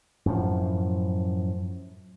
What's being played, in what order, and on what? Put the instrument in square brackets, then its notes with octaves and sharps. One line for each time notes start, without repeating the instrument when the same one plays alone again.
[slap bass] F#2 A2 F3